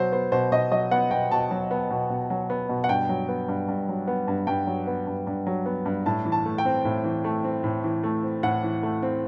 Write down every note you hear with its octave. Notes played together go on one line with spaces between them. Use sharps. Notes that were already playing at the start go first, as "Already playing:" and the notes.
Already playing: B2 F#3 C5
B3 C5
B2 C5
B2 D#5
F#3 D#5
B3 F#5
B2 G5
B2 A5
F#3
B3
B2
B2
F#3
B3
B2
F#5
G2 G5
F#3
B3
G2
G2
F#3
B3
G2
G2 G5
F#3
B3
G2
G2
F#3
B3
G2
A2 A5
E3
A5
A3
G5
C4
A2
E3
A3
C4
A2
E3
A3
C4
A2 F#5
E3
A3
C4